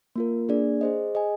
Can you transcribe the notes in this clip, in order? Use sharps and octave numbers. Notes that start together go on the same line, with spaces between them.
A#3 F4 A#4
A#3 D4 G#4 D5
G#4 C5 D#5
G#4 D#5 G#5